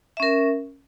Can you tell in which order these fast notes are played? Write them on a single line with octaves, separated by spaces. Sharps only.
E5 C#4 A#4